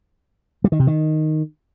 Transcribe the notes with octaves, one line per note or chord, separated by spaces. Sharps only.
G3
D#3
C3
D#3